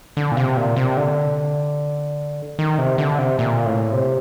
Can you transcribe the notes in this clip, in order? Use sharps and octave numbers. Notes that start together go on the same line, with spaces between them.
D3
A#2
C3
A#2
C3
D3
D#3
C3
D3
C3
A#2
A2
C3